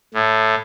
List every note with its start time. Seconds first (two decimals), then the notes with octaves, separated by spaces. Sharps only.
0.14 A2